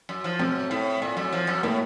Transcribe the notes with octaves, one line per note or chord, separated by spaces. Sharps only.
F#2
F3
F#2 C4
A2
A#2
F#2
F3
F#2
A2 A#3